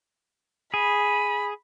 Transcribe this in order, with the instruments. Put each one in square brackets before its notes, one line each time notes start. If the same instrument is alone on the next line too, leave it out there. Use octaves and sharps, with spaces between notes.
[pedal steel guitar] G#4 [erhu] B5